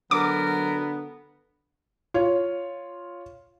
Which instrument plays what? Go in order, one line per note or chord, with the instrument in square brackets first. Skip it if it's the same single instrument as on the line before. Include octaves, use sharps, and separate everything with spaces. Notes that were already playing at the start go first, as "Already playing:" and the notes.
[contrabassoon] D3 [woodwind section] F#3 A#4 [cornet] B3 [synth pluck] D6
[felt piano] F4 C#5